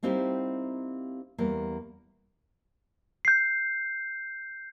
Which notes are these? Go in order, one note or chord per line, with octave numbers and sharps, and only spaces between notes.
G3 A#3 C4 D#4 E4 G4
E2 G3 A#3
G6 C7